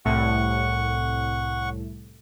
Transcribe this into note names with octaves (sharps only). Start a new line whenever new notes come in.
C2 A2 F#5 C#6